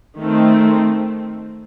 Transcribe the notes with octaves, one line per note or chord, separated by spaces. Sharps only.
D#3 A3 C4